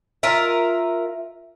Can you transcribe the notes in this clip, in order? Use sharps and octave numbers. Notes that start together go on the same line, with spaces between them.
F4 A#4 E5